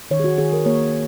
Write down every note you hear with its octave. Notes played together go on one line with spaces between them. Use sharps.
D#3 C#5
G#4
F#4
D#3 G#4
A#4
A#3 C#5